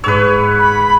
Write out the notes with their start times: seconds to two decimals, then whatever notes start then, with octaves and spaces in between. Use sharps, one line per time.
0.04 G#2 B4 C#5 E6
0.59 B5